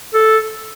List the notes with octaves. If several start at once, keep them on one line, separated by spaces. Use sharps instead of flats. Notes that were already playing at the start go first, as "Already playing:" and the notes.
A4